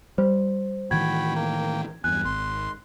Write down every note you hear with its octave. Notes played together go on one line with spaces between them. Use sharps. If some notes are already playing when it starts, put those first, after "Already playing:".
G3 C5
A2 D#3 E3 F#4 G5 B5 G#6
A#3 G5
E2 G2 G#5 F#6
G#1 C6